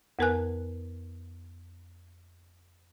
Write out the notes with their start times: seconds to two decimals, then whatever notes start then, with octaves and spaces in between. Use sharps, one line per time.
0.19 F2 B3 A#4 B4 G#5 F#6